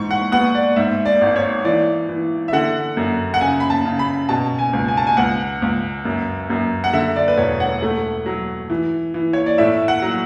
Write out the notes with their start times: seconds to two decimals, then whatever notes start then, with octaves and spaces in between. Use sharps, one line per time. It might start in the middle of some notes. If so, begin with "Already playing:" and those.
Already playing: G#2 E3 C#6
0.11 F#5
0.32 B3 F#5
0.55 D5
0.76 G#2 E5
1.05 D5
1.21 G#1
1.36 C#5
1.64 E3 D5
2.09 E3
2.48 E5
2.53 D3 F#5
2.97 F#2
3.34 F#5
3.41 C#3 G#5
3.60 B5
3.70 A5
3.85 C#3
3.99 B5
4.29 B2 A5
4.59 G#5
4.73 C#2
4.88 G#5
4.97 A5
5.07 G#5
5.17 C#2 F#5
5.62 C#2
6.05 F#2
6.50 F#2
6.84 F#5
6.93 D3 E5
7.16 D5
7.28 B4
7.38 E1 C#5
7.60 F#5
7.82 A3
8.26 F#3
8.70 E3
9.14 E3
9.33 C#5
9.46 D5
9.58 A2 E5
9.88 F#5
10.02 F#3